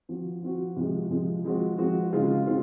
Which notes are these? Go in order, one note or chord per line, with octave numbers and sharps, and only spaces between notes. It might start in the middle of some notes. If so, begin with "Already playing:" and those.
F3 C4 F#4
F3 C4 F#4
C3 F3 G#3
C3 F3 G#3
F3 G#3 C4 F#4
F3 G#3 C4 F#4
C#3 G#3 C4 F4
C#3 G#3 C4 F4